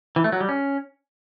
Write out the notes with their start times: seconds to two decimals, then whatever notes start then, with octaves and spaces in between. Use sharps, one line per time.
0.16 E3
0.24 A3
0.32 F#3
0.41 G3
0.49 C#4